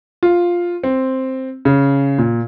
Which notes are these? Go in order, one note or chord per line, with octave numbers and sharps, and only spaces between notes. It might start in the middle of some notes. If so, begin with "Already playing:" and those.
F4
C4
C#3
A#2